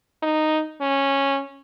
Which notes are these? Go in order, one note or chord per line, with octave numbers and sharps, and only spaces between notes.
D#4
C#4